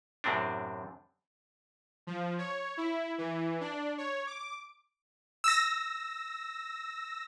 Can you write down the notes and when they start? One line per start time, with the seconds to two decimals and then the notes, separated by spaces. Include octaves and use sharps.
0.24 F#2 A2 C3 C4 D4
2.07 F3
2.38 C#5
2.77 E4
3.18 E3
3.61 D4
3.98 C#5
4.27 D6
5.44 E6 A#6